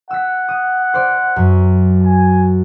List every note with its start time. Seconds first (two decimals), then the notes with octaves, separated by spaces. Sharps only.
0.10 F#5 E6 B6
0.48 D#6
0.94 C5 D5
1.36 F#2
2.04 G#5